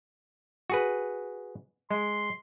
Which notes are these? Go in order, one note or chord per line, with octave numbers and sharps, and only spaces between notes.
F#4 G#4 B4
G#3 C6